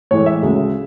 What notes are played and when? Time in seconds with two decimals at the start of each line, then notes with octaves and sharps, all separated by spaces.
0.11 A2 E3 G#3 C#5
0.26 E5
0.42 D2 C#3 G#3